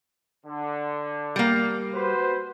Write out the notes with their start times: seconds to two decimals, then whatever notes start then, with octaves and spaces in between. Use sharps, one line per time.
0.46 D3
1.36 G3 A#3
1.94 F#4 B4 C5